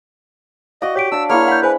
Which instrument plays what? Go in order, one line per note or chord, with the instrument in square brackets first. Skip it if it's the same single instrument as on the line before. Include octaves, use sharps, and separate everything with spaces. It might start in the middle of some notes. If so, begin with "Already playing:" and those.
[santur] F#4 D5 [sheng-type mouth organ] D#5 [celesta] F5
[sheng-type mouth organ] G4 [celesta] C#5 B6 D7
[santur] D4 F5 A5 [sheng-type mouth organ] E6
[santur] A#3 E4 [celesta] G#4 F#5 [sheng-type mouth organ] C#5 F6
[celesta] F#5 G6 [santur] B5
[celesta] G#4 C5 G#5 [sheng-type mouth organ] B4